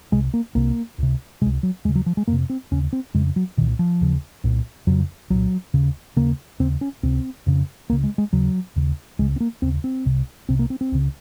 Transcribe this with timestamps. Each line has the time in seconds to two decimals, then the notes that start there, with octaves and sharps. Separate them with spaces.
0.12 C2 C3 G#3
0.34 A#3
0.55 C2 C3 A#3
0.98 C#2 C3
1.42 C3 G#3
1.45 C#2
1.63 F#3
1.85 D#2 G#3
1.89 C#3
1.95 F#3
2.06 F3
2.17 G#3
2.28 F2 C3 A#3
2.50 C4
2.71 D#2 C#3 C#4
2.93 C4
3.14 F2 C#3 G#3
3.36 F#3
3.57 A#2 D#3
3.60 C2
3.79 F3
4.01 D#2 C#3
4.44 C2 A#2
4.87 F2 C#3 F#3
5.30 C2 A#2 F#3
5.74 D#2 C#3
6.16 D#2 C#3 A#3
6.60 D#2 C#3 C4
6.81 C#4
7.03 C#2 C3 C4
7.46 F2 C#3
7.90 C#2 A#3
7.92 C#3
8.04 G#3
8.18 G#3
8.33 D#2 C#3 F#3
8.76 D#2 C#3
9.19 C#2 C#3 G#3
9.36 C4
9.40 A#3
9.62 D#2 C#3 C4
9.84 C4
10.05 C2 C3
10.49 C2 C3 C4
10.59 A#3
10.70 C4
10.81 C4
10.92 C#2 C#3